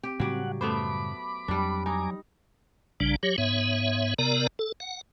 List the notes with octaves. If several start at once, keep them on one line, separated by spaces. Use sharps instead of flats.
C4 G4
A2 C#3 F#3 G3 G4 F#5
F#2 A3 B3 C5 B5 D6
F2 F#3 G3 D4
D#4 G#5 A#5 D6
A#1 C#3 G3 D4
F#3 G4 C#5
G#2 B3 C#5 E5
C3 B3 A#4 D5 A#5
A4
F#5